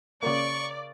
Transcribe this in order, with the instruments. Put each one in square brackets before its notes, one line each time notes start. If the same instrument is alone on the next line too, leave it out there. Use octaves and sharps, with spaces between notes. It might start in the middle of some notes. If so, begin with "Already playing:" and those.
[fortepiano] C#3 A#3 [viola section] D5 [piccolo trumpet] C#6